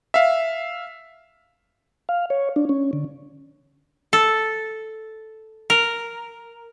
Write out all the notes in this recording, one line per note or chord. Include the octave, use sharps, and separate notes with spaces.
E5 F5
F5
C#5
D4
C#4
D3
A4
A#4